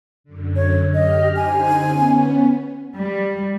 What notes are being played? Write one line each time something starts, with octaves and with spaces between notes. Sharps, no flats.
F#2 D3
C#5
G4 D#5 F6
D3 D#4 C5 G#5
B3 C#4
G3